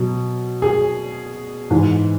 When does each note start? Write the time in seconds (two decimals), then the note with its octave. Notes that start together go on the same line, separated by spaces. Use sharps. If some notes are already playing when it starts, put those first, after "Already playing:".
Already playing: B2 F#3
0.62 G#4
1.71 G#2 E3 G#3